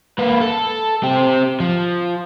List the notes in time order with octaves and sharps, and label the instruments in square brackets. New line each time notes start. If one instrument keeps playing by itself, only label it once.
[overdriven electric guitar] A#3 B4
A4
C4 G4
F3